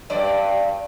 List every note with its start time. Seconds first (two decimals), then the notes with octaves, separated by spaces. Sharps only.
0.10 G2 D5